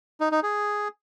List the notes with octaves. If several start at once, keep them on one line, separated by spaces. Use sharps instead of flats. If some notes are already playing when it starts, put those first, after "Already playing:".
D#4
D#4
G#4